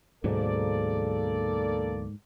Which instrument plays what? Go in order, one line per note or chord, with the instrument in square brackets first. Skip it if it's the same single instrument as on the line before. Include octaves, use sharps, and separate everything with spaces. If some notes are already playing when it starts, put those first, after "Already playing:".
[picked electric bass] D2 B2 F#3 [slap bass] G#2 [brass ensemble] A#3 A4 D5